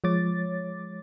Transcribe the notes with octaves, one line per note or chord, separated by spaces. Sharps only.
F3 G#3 C#5 D6 A6